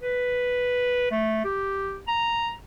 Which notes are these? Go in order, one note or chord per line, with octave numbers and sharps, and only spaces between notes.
B4
A3
G4
A#5